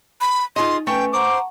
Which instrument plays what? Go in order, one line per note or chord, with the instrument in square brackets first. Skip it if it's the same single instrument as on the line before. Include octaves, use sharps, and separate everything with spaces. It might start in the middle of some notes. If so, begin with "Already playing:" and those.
[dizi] B5
[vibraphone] D#4 [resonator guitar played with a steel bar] F4 G#4 D#5 [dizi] C6
[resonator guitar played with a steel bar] A3 [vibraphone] C#4 B4 G#5 [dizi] G5
[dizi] C5 [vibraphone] F#5 A#5 C#6 [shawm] D6